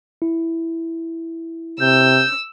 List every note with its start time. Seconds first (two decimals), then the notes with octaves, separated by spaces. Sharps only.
0.22 E4
1.81 C3 E6 G6